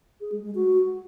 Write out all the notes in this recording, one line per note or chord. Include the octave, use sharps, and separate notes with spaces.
G#4
G#3
G#3
F#4